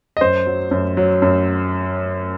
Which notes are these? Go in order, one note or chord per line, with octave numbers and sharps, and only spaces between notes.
D#5
F#2 C5
F#3
F#2
F#3
F#2